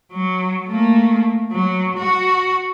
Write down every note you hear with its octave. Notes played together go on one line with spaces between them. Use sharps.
F#3
A3 A#3
F#3
F#4